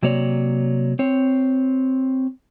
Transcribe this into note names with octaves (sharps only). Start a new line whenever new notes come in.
C3 F#3 A#3 C#5 D5
C4 C#5